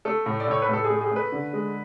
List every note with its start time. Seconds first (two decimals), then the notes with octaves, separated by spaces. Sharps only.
0.05 A3 A4
0.26 A2
0.40 D5
0.47 A2 C#5
0.62 B4
0.69 A2 A4
0.84 G#4
0.90 A3
1.01 G#4
1.11 A3 B4
1.32 D3
1.53 G#3